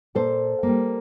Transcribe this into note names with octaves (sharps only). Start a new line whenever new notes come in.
A#2 A4 C5
G3 A#3